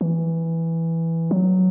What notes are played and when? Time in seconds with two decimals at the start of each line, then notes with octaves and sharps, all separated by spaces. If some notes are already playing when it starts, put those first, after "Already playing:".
0.01 E3
1.31 F#3